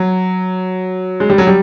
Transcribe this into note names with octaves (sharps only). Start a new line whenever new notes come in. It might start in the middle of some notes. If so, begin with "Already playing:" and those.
Already playing: F#3
G#3
G3
F#3
G3